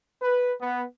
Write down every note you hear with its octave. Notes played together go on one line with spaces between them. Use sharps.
B4
B3